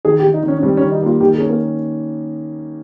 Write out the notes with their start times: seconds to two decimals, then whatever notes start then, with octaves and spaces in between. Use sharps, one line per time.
0.05 D#3 G#4
0.19 G4
0.24 D#3
0.34 D#4
0.43 D#3 C#4
0.58 C#4
0.63 G3 C4
0.77 C#4
0.82 D#3
0.92 D#4
1.01 A#3 F4
1.20 D#3 G4
1.35 G#4
1.40 C#4
1.49 A#3